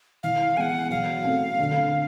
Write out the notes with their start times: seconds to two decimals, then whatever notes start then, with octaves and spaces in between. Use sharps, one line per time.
0.23 E3 F5
0.57 G#3 B3 F#5 G#5
0.90 F#3 F5
1.24 A3 C4
1.59 D3